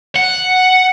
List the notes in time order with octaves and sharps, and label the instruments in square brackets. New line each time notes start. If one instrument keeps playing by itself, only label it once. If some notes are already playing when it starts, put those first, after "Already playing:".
[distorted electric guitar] F#5